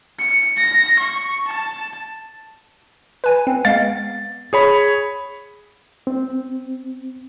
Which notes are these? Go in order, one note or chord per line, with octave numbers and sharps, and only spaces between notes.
C#7
A#6
C#6
A5
B4 G#5
C4
G#3 B3 F5 A6
G#4 C#5 B5
C4